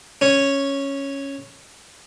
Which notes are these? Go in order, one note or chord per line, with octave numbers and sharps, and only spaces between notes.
C#4 C#5